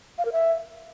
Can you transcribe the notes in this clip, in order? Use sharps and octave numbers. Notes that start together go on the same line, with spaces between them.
F5
A#4
E5